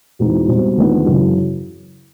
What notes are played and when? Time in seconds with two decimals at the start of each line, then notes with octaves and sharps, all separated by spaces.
0.19 E2 B2 G#3 C4 D#4
0.48 B2 G3 C4
0.77 D#2 D3 F3 G#3 B3
1.06 F#2 C#3 E3